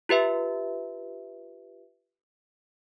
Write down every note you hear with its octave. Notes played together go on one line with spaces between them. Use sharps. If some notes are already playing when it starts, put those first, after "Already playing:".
F4 G4 B4 E5